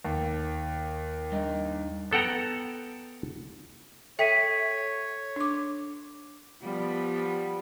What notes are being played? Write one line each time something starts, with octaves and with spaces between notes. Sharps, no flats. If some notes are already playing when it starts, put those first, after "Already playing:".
D#2
G2 D#4
B3 A4 F#5 G5 A#5
A4 C#5 E5 G5 B6 D#7
D4 D6
F3 G3 B3